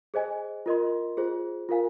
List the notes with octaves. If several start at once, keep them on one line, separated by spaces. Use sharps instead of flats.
G#4 C5 D#5 G#5
F4 A#4 D#5 C6
F4 G#4 C5
F4 A#4 F5 G#5